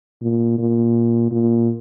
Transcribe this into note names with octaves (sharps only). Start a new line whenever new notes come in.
A#2
A#2
A#2